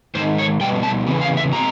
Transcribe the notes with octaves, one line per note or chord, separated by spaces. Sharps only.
G#2 D#3 C5
C#5
B2 G3 B3 G5
A5
E2 C#3 E3
F5
E5
B2 G#3 C4 A#5